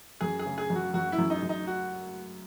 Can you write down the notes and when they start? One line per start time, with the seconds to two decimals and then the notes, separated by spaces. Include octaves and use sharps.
0.21 F#2 G#4
0.39 G#4
0.46 C#3
0.58 G#4
0.70 F#2
0.75 F#4
0.94 F#2 F#4
1.12 E4
1.18 F#2
1.30 D#4
1.43 F#2
1.49 D#4
1.67 F#4